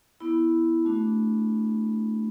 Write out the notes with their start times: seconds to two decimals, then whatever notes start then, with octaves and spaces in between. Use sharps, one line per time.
0.20 B3 E4 B5
0.85 A3 D4 F#4